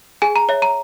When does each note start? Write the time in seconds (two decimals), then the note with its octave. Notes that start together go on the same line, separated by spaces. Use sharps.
0.22 G#4 G#5
0.36 A#5
0.49 C#5 E5
0.62 A#5